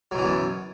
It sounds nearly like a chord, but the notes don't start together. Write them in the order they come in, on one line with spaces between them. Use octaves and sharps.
F#3 B2 E3 B3 F#2